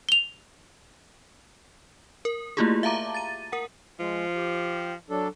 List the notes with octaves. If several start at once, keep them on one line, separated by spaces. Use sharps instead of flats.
F7 G7
A#4
A3 A#3 E4 F4 G4 G#4
E5 F5 A5 A#5 D6
A6 D#7
A#4 F#5
F3 G#3
G4
F#3 D4 A4